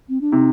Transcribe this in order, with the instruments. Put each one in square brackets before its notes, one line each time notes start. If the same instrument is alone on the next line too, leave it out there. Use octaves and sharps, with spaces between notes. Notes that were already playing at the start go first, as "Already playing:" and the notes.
[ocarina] C4
D4
[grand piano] C3 [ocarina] D#4